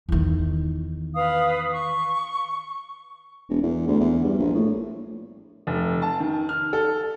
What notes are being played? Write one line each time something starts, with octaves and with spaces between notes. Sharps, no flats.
E2 D#3
B4 F5 D#6
C#6
E1
E2
D2
E2
G2
A#1
A2
F1
A5
D#3
F6
A4